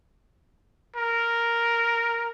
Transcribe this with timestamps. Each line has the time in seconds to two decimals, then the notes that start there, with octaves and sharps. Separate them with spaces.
0.97 A#4